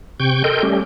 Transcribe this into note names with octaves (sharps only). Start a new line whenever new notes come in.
C3 G5 C#6 G6
A4 A#4 D#5 G5 C6 G6
G3 A3 C#4 G4